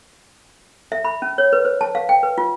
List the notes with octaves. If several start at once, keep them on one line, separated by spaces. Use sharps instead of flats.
E5
B5
C#4
C#5
B4
C5
A5
F5
G5
B4
F4